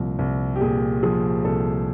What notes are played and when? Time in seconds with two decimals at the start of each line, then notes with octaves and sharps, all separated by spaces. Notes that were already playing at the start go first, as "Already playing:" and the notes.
Already playing: C2 A#2 F3
0.19 C2
0.56 G4
0.61 A#2 G#4
1.03 F3 G#4
1.44 C2 A4